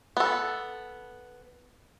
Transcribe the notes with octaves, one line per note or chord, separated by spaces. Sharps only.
B3 A4